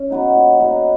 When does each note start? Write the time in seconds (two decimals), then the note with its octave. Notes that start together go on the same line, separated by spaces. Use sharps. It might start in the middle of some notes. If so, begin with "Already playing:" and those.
Already playing: C#4
0.10 F#3 B3 D#4
0.35 A#2
0.60 F#3 B3 D#4